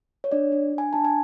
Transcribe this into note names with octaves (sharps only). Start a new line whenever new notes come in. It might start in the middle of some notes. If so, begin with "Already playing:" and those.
C#5
D4 D5
D4
D4 G#5
D4 A5
G#5